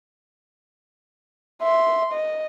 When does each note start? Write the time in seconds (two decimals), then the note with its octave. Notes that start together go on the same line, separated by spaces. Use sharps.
1.62 E5 C6
2.12 D#5